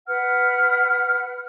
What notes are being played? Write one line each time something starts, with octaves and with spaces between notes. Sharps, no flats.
B4 F#5 F6